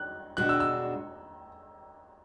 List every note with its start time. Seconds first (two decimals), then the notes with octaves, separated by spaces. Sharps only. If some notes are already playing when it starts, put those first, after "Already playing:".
Already playing: F#6
0.37 B2 G#3 D4 F#4 F#6
0.49 E6
0.60 E6